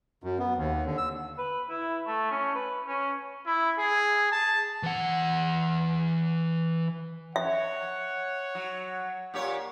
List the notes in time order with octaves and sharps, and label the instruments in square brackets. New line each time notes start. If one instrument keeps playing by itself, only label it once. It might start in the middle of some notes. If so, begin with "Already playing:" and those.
[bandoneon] F#2
B3
D#2
D3
E6
[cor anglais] B4
E4
A3
C#4
B4
C#4
[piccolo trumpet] E4
G#4
A5
[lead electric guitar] E3 F#5
[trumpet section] C#5 F#5 [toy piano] E5
[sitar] F#3
A#2 G4 C#5